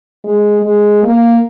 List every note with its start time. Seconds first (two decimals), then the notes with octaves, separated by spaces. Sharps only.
0.24 G#3
0.63 G#3
1.03 A#3